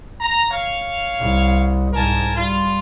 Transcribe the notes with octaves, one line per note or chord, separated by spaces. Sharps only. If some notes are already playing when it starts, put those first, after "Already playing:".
A#5
C#5 F5
C2
C2 G#2 A#4 G#5 A5
G3 F4